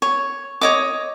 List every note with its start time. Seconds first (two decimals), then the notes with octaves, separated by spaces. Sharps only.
0.02 C#5
0.61 C#5 D#5 D6